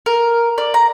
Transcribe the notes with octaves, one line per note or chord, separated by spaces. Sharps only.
A#4
D5
A#5